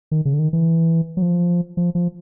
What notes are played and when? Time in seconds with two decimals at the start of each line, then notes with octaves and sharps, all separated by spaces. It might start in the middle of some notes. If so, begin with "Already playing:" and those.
0.11 D#3
0.25 C#3
0.34 D3
0.39 D#3
0.53 E3
1.17 F#3
1.22 F3
1.77 F3
1.95 F3